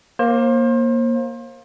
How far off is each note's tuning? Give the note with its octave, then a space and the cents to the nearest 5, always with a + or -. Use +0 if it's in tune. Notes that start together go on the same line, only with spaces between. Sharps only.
A#3 +10 C5 +35